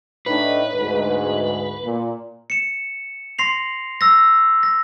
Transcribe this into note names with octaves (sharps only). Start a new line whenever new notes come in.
A2 D4 D#4 B4
D2 G#2
A#2
C#7 E7
C6 A#6 C7 F7
E6 A#6
A#6